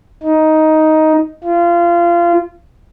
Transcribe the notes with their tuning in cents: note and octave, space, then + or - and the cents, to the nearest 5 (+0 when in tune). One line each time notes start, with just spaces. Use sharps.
D#4 +10
F4 -25